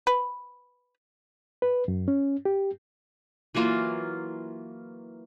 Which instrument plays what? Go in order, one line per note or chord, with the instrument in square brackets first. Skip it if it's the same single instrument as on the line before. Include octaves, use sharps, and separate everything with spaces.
[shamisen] B4
[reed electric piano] B4
F#2
C#4
G4
[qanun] E3 F#3 A#3 F4